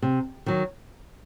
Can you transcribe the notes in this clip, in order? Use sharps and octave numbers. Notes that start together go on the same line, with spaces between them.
C3
D#3 F#3